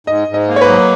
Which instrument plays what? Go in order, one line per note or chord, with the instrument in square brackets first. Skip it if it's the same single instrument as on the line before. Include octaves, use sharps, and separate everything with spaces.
[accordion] G#2 [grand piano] D#5
[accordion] G#2
[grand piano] D#5
[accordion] A#3
[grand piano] C#5
B4
[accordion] F#3